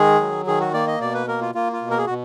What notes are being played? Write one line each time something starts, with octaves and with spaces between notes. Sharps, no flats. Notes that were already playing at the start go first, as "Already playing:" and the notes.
Already playing: D#3 G#3 G#4
F#3
D#3 G#4
F#4
A#3 D5
D#5
B2 D5
B4
A#3 A#4
F4
A#3 F4
F4
B2
A#4
G#4
B2 F#4